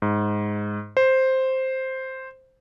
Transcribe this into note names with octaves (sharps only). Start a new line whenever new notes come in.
G#2
C5